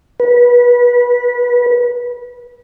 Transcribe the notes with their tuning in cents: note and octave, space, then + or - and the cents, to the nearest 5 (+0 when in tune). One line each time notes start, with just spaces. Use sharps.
B4 -25